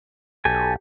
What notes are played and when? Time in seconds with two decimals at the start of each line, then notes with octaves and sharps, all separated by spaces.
0.45 B1 G4 A4 G#5